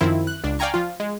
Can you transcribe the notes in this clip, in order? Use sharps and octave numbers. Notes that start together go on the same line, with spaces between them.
F#2 D#3 F3 C4 E4
F#6
C#2 D4
D5 F5 G5 G#5 A#5 C#6
F3 F4
G#3